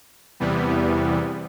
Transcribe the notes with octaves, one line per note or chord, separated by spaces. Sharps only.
E2 C3 E3 G3 B3